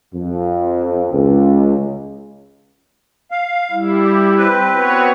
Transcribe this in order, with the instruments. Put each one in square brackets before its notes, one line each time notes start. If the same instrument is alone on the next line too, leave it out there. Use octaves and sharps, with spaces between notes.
[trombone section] F2
C#2
[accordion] F5
[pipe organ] G3 E4
[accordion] G4
C4 B4
[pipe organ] B3 F#4 C#5